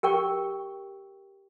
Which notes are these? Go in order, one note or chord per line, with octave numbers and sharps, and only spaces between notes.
G4 A#4 G5 C#6